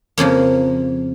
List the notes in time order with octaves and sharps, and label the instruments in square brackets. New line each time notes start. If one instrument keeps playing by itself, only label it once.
[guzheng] F2 C#3 F3 A#3